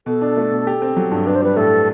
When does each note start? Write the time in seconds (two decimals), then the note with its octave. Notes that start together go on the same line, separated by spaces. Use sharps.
0.06 B2 A4
0.22 D4
0.37 A3
0.52 B2
0.67 G4
0.82 C4
0.97 F#3
1.11 G2
1.27 D4 B4
1.35 C5
1.42 G3 B4
1.57 A2 A4